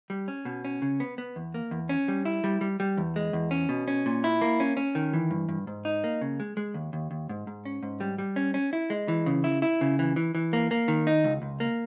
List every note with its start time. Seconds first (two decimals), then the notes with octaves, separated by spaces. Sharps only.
0.10 G3
0.28 C#4
0.45 B2
0.65 C#4
0.82 C#3
1.00 B3
1.18 B3
1.36 E2
1.54 A#3
1.71 E2
1.89 C#4
2.08 G3
2.25 E4
2.44 G3
2.61 G3
2.80 G3
2.97 E2
3.16 G#3
3.33 E2
3.51 C#4
3.69 B2
3.88 C#4
4.06 A#2
4.24 E4
4.41 A#3
4.60 C#4
4.77 C#4
4.95 D#3
5.13 E3
5.31 G2
5.49 G2
5.67 G#2
5.85 D#4
6.04 A#3
6.22 C#3
6.40 G#3
6.57 G#3
6.74 D#2
6.93 D#2
7.11 D#2
7.29 G#2
7.47 G#2
7.65 C#4
7.83 G#2
8.01 G3
8.18 G3
8.36 C#4
8.54 C#4
8.73 E4
8.90 G#3
9.08 E3
9.26 C#3
9.44 E4
9.62 E4
9.81 C#3
9.99 E3
10.16 E3
10.35 E3
10.53 A#3
10.71 A#3
10.88 D#3
11.07 D#4
11.24 C#2
11.42 C#2
11.60 A#3